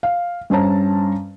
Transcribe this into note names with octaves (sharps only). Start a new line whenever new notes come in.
F5
G2 C#4 C5 A5 A#5